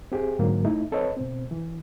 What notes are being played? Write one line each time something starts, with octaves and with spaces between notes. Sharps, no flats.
C4 G4 G#4
G#2 D3 F#3 A#3
A3 D#4 E4
C4 A4 B4 C#5 D#5
B2 C4
E3